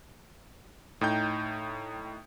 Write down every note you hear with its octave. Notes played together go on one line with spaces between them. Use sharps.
A2 D#4 G5 G6